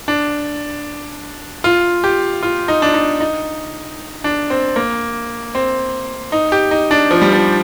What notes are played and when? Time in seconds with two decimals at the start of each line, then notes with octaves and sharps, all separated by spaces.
0.08 D4
1.64 F4
2.04 G4
2.43 F4
2.68 D#4
2.82 D4
2.94 D#4
3.20 D#4
4.24 D4
4.50 C4
4.76 A#3
5.55 C4
6.32 D#4
6.52 G4
6.71 D#4
6.91 D4
7.11 F3
7.22 G3
7.32 F3